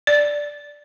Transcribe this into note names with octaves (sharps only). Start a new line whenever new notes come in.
D5